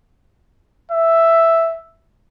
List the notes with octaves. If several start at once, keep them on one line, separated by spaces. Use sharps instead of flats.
E5